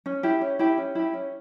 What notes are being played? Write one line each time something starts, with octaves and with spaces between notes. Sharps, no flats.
C#4
E4 G4
C#4
E4 G4
C#4
E4 G4
C#4